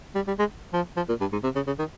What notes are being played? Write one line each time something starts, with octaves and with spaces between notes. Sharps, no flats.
G3
G3
G#3
F3
F3
A#2
G2
G#2
C3
C#3
C#3
D#3